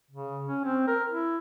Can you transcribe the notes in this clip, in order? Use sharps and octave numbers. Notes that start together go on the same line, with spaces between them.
C#3
C#4
C4
A#4
E4